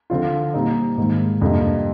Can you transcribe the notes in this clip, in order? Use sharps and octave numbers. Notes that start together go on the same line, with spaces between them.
D3 F3 C4 F4
A#2 G3 C4 D#4
G#2 D#3 A#3
F2 C3 G3 A#3 D4